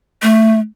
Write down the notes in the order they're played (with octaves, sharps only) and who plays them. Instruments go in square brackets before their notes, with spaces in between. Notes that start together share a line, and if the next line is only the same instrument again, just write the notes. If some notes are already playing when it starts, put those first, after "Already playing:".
[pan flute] A3